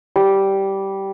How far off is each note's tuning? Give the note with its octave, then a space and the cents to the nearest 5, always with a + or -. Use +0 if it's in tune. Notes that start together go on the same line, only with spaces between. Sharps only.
G3 -10